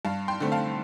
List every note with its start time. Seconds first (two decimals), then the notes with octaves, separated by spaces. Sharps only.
0.05 G2 F5 A5
0.28 G5 C6
0.40 D3 A3 C4
0.52 F5 A5